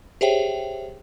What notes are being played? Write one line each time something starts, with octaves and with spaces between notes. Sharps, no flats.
G4 G#4 C5 C#5 E5 G5